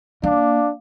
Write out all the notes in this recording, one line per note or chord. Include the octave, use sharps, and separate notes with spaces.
A#3 D4 F5 D6